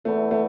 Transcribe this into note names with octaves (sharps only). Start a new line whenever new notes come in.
E2 A3
A3